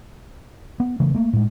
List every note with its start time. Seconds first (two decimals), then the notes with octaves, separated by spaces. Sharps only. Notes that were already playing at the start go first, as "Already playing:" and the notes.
0.80 B3
1.00 C#3 E3 A3
1.15 A3 A#3
1.33 A2 G#3